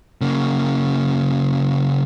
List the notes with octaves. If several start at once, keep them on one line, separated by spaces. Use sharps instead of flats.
C#3 A#3